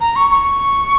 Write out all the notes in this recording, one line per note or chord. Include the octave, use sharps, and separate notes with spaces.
A#5
C#6
C#6